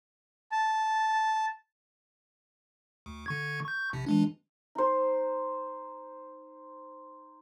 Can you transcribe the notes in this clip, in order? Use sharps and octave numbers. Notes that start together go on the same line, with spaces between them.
A5
D2
D3 C#6 G#6
C#6 G6
A#1 C3
E3 G#3 D4
D#4 C5